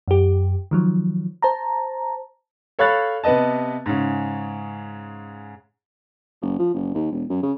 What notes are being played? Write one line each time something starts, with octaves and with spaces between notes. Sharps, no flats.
F#2 G4
D#3 F3 F#3
C5 A5 A#5
A4 C#5 F5 B5 F#6 A6
C3 B3 B4 D#5 A5
G#2 C#3
F#1
F3
F#1
D#2
E1
F#2
C#3